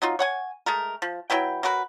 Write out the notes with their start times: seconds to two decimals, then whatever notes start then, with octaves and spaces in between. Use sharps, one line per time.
0.02 F#3 D#4 F4
0.19 C#5 F#5 G#5
0.66 G#3 A3 A#4
1.02 F3
1.30 F#3 E4 B4 G5
1.63 F#3 F#4 A#4 B4